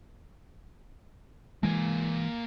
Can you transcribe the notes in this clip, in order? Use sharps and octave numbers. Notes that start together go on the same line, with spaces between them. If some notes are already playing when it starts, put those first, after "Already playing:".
E3 G#3 A#3 G#5